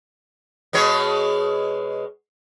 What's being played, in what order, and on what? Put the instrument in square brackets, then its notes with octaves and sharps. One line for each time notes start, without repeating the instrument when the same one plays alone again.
[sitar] B2 G#3 C#5